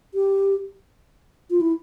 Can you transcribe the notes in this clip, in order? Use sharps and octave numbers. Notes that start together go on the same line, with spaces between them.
G4
F4
E4